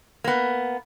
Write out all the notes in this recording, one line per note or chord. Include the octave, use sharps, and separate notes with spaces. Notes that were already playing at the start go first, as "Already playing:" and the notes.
A#3 B3